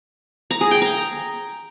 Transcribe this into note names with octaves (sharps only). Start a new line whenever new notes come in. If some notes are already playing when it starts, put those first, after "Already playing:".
A#5
G#4
G5
A#5